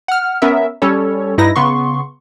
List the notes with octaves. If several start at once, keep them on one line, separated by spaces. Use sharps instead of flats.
F#5 F6
B3 C#4 A#4 E5
G3 C#4 A4 C#5
G2 D#4 E4 B4 A#6
C#3 B3 C6 C#6